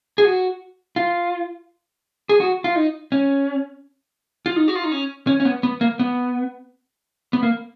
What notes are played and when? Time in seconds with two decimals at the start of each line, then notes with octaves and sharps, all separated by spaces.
0.18 G#4
0.25 F#4
0.96 F4
2.29 G#4
2.40 F#4
2.64 F4
2.76 D#4
3.12 C#4
4.46 F4
4.56 D#4
4.68 F#4
4.75 F4
4.84 D#4
4.92 C#4
5.27 C#4
5.40 C#4
5.45 B3
5.63 B3
5.81 A#3
5.99 B3
7.33 B3
7.43 A#3